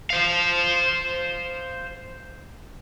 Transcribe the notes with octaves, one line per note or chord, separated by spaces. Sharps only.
C5 F5